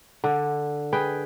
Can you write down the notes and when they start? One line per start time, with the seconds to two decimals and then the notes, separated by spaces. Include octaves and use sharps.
0.24 D3
0.93 G#4 B4 G5